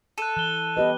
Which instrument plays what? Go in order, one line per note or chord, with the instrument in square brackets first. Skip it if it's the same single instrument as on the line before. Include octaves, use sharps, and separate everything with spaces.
[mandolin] A4 [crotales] F#6 D#7
[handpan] E3 [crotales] F#6 G7
[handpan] B3 G4 B4 [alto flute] D#5